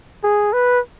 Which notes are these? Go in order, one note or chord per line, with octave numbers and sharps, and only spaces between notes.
G#4
B4